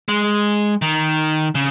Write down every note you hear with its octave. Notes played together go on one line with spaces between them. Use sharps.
G#3
D#3
C#3